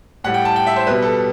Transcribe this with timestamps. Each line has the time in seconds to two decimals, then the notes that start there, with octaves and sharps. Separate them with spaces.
0.24 A2 G3 F#5
0.34 G5
0.45 A5
0.56 G5
0.67 E5
0.76 C5
0.87 B2 G3 B4
1.02 A4